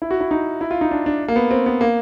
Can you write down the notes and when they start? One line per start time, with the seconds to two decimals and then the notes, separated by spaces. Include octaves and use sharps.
0.02 E4
0.11 F#4
0.21 E4
0.31 D#4
0.61 E4
0.71 F4
0.81 D#4
0.91 D4
1.06 D4
1.28 A#3
1.36 B3
1.51 C4
1.66 B3
1.81 A#3